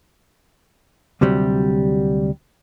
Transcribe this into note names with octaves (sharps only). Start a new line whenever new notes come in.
D2 C3 F#3 G3